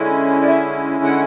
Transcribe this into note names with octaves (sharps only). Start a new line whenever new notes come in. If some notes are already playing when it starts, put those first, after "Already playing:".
Already playing: D3 G#3 C#4 E4
D5
E5
F#5